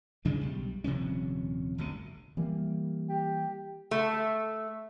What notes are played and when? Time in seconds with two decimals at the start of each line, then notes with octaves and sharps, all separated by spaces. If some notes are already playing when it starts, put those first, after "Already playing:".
0.25 D2 C#3 G#3 D4
0.41 B1 G3
0.84 D#1 C3 F3 C#4
1.78 G1 D2 C3
2.37 E3 G3 A#3
3.09 G4
3.91 A3